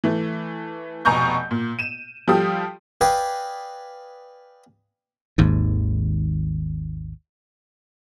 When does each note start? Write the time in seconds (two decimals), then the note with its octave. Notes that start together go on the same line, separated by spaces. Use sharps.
0.04 E3 A3
1.05 F1 B2 G#5 A#5 C#6 G6
1.51 A#2
1.79 D#7 E7
2.28 F3 G3 F4 G4 A4 D#6
3.01 B4 D5 D#5 F5 G5 G#5
5.38 G#1 D#2 G#2